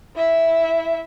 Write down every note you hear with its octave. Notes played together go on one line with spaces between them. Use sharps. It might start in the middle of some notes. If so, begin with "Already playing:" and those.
E4 E5